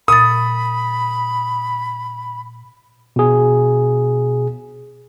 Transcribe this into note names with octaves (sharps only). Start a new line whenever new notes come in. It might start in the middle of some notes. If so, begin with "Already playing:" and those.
A#2 B5 D#6 A6
B2 G#4